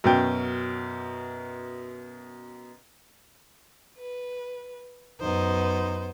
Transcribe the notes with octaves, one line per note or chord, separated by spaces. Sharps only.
F#2 B2 G5
B4
F#2 B3 D#4 C5